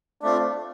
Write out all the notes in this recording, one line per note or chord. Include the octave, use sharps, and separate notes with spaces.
A3 C4 D4 F4